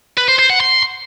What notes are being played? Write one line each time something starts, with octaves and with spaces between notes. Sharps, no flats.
B4
C5
C5
F#5
C6